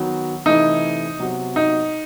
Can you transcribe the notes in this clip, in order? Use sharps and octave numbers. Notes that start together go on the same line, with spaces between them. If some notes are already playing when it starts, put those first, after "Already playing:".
Already playing: D#3 F#3 B3 F#4
C3 E3 A3 D#4 E4
C3 F#3 B3 F#4
D#4